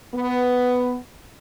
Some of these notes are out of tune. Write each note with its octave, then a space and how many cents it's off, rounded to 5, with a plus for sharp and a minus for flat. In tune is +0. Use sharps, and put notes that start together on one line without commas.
B3 +10